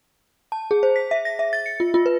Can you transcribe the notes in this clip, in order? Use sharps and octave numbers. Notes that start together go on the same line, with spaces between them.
A5
G#4
C5
B6
E5
A#6
E5
A6
C#7
F4
F4
B4